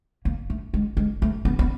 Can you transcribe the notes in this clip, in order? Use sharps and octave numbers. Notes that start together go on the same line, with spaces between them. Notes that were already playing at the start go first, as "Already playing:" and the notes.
A#3
A3
G#3
G#3
A3
B3
B3